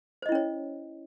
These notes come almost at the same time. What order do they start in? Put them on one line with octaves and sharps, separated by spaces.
C5 D#5 E4 C#4 C#5